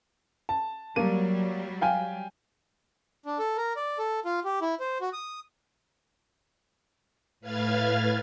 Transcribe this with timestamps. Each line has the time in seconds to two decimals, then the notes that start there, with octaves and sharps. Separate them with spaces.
0.49 A5
0.96 F#3 G3 A#3 D#7
1.81 F5 G5 G#5
3.25 D4
3.39 A4
3.57 A#4
3.76 D5
3.98 A4
4.25 F4
4.44 G4
4.61 E4
4.80 C5
5.01 F#4
5.13 D#6
7.41 A2 B4 F5 F6 G#6 A6